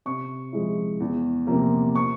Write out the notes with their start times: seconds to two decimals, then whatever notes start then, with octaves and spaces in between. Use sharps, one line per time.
0.06 C3 C#6
0.52 F3 G#3 E4
1.00 E2
1.47 C3 F3 A#3
1.95 C#6